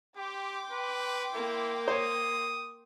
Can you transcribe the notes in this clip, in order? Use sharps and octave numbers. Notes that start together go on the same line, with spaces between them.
G4 G5 C6 D6
B4
A#3 E4
C5 C#5 D#6